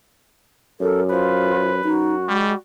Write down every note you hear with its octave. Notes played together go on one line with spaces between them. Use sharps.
F#2 A4 A#4
F4 B4 C5
F#2 D#4 F#4
G3 G#3